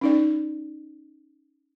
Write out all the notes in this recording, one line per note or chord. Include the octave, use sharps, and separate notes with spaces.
C#4 D#4 D5